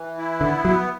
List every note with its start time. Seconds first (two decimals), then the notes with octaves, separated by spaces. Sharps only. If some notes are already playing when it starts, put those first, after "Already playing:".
Already playing: E3
0.18 E4
0.41 D3 B3
0.65 F#3 B3